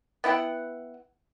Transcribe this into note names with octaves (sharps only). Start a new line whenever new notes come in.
B3 E4 F#5 G5